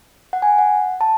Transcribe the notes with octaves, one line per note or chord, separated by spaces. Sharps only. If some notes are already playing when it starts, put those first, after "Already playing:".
F#5
G#5
F#5
A5